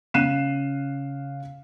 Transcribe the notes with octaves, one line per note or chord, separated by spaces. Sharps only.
C#3 F5 F#6 C7 D#7 E7